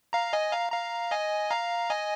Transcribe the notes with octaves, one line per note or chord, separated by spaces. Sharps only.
F5 A#5
D#5 G#5
F5 A#5
F5 A#5
D#5 G#5
F5 A#5
D#5 G#5